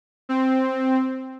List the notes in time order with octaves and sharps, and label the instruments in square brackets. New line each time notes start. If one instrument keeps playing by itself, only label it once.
[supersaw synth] C4